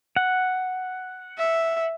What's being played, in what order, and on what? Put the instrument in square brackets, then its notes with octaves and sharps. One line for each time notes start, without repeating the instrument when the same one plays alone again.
[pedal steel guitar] F#5
[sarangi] E5